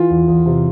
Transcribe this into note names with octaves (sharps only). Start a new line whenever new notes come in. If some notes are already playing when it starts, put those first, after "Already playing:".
Already playing: E3 F4
E2
E2
C3